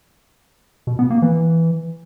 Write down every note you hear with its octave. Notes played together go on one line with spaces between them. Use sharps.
B2
B3
A#3
E3